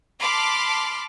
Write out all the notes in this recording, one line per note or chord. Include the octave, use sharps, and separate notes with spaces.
A5 B5 C6 D6 F6